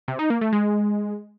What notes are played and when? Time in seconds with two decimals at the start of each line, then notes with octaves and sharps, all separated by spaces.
0.08 C3
0.19 D#4
0.30 A#3
0.41 A3
0.53 G#3